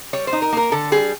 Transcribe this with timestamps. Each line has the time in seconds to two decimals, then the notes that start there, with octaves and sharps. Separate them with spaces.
0.13 G3 C#5
0.27 C5
0.33 D#4
0.42 A#4
0.53 A#3 A#4
0.72 D3 A4
0.92 G3 G#4